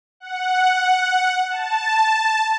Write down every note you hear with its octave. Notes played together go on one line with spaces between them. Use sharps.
F#5
A5